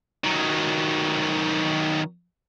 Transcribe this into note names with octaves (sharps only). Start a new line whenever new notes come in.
D#3 F#3